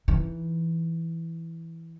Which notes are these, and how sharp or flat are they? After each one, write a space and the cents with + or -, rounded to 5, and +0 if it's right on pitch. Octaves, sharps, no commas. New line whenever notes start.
E3 +0 D#4 +15